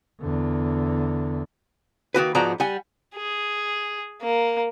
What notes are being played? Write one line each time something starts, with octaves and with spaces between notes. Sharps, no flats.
E2 D3
D#3 A#3 F#4 B4
G#2 F3 B3 F#4 D5 A#5
G3 F#5 G#5
G#4
A#3